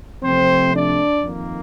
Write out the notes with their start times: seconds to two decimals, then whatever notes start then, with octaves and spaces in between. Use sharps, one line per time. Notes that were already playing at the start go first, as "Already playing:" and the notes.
0.22 C3 F3 A3 C4 C5
0.73 D4 D5
1.23 F2 D#3 A#3